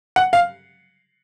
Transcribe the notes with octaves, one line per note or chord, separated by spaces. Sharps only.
F#5
F5